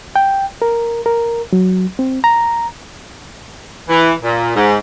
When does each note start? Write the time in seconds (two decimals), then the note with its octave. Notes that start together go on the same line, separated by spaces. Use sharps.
0.16 G5
0.62 A#4
1.06 A#4
1.53 F#3
1.99 C4
2.24 A#5
3.89 E3
4.22 A#2
4.56 G#2